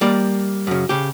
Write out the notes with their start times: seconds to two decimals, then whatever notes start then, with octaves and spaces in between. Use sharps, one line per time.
0.01 G3 A#3 D5
0.67 F#2 C#3
0.89 C#3 G4